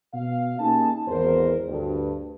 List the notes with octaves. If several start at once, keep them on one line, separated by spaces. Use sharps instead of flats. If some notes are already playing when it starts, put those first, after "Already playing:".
B2 F5
A#3 C#4 D#4 G4 G#4 A5
G#1 E2 A#4 C5
D2 G2